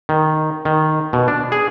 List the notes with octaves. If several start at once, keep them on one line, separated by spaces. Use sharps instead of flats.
D#3
D#3
B2
D4
G#4